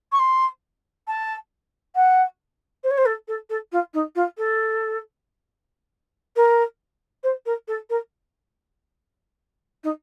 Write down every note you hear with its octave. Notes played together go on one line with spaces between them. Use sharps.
C#6
C6
A5
F#5
C5
C#5
C5
A4
A4
A4
F4
D#4
F4
A4
A#4
C5
A#4
A4
A#4
D#4